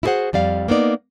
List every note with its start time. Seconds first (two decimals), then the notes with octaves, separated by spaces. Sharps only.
0.03 E4 F#4 G#4 A#4 C5 F#5
0.33 F2 G3 D5 F5
0.68 A#3 B3 D#4 D5